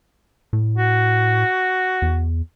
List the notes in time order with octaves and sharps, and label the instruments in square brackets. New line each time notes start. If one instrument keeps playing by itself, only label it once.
[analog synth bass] A2
[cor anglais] F#4
[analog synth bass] E2